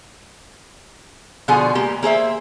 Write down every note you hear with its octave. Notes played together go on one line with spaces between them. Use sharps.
B2 D3 F3 G#4 F#5 G#5
G#3 A#3 G4
A#3 G#4 C5 E5